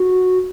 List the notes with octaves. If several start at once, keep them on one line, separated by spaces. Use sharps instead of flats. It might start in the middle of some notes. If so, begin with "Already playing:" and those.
Already playing: F#4